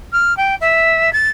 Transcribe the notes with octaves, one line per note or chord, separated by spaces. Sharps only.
F6
G5
E5
A6